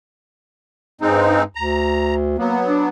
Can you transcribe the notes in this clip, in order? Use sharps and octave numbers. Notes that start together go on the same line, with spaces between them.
G2 G#3 C4 D#4
D2 A#5
F#3 A#3 B3
D4